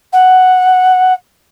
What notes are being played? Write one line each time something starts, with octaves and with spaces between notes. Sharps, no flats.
F#5